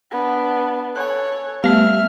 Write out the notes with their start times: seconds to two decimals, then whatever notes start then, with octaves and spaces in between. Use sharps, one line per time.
0.12 B3 D4
0.96 A4 C#5 G#5 F#6
1.64 G3 A3 B3 E5 F5 F6